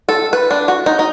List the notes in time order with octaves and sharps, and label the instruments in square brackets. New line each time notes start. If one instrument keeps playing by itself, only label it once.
[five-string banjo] A4
B4
D4
F#4
D#4
D#4